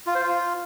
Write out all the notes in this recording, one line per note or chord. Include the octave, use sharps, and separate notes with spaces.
F4
C5
F4